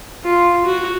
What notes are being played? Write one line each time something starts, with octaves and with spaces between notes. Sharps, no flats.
F4
F#4